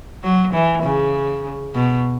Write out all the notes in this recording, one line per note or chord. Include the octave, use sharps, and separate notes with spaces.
F#3
E3
C#3
B2